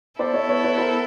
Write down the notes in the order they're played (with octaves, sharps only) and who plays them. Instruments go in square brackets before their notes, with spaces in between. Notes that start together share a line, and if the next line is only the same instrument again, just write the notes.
[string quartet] B3 E4 A4 [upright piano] C5 D5
[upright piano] C#5 D#5
B4 C#5
B4 C#5
A#4 C5